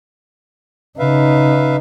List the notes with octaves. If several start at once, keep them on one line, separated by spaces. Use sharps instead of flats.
C#3 D#4 B4 E5 F5